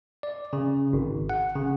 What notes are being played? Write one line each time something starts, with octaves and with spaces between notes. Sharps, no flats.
D5
C#3
G#1
F#5
C#3